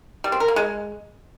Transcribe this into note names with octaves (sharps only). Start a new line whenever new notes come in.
G3
C4
A#4
A#3
G#3